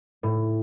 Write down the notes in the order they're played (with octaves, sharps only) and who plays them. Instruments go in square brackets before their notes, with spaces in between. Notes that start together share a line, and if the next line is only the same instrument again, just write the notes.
[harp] A2